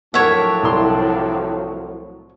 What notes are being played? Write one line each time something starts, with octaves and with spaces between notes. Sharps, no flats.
A2 F3 F#3 D4 A#4 C#5 E5 F#5
C2 C6